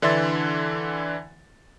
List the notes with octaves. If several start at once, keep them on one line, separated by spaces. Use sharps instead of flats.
D3 E3 D4 E5 C6 A6